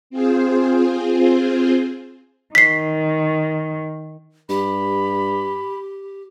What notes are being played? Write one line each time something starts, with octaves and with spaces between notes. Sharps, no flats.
C4 F4 G#4 C5
D#3 B6 C7
G2 G4 B5